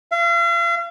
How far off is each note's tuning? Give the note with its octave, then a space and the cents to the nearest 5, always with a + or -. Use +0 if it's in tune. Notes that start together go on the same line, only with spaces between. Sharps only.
F5 -40